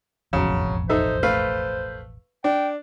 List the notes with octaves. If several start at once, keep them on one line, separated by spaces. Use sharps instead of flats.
E1 A1 F2 C#3 F#3
D#4 A4 C5 E5
A3 B4 F5
D4 G5